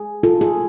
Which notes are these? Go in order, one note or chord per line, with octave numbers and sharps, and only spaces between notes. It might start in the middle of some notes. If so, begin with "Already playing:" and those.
Already playing: G#4
F4 A4
G#4